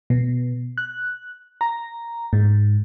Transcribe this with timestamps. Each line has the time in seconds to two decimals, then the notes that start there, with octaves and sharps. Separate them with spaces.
0.10 B2
0.78 F#6
1.61 A#5
2.33 G#2